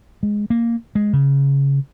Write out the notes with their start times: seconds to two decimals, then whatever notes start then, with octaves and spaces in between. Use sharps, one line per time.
0.23 G#3
0.50 A#3
0.95 G#3
1.13 C#3